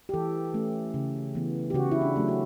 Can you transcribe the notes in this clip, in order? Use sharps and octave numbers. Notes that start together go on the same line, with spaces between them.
G4
E3 A4
A3 C#4
C#3
E3 B3
G4
C#3 F#4
E4
D4
F#3 A3 C#4
F#4